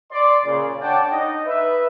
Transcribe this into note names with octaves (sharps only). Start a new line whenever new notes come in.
D5 C6
A#2 C#3
D4 C#5 D5 F#5 G5 A5
D#4 D#5
B4 E5